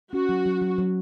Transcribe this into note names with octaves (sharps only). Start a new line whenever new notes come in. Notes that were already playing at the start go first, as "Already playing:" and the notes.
C#4 F#4
F#3
F#3
F#3
F#3